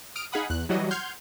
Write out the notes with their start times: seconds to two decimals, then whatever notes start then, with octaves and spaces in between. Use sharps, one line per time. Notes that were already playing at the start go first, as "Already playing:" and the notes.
0.15 D#6 F6 D7
0.32 D#4 G#4 F5 F#5 B5 D#6
0.50 E2 F#6
0.69 E3 F#3 G3 F#4 D#5
0.91 F#5 C6 F6 G6 G#6